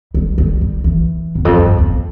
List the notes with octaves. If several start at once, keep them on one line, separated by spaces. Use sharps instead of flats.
G3
G3
G3
E3
E2
F2
G2
E2